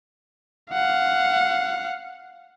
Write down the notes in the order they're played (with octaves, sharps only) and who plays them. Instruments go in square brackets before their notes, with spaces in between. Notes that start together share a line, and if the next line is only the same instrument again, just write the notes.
[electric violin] F5 F#5